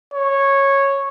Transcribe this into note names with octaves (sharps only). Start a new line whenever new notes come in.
C#5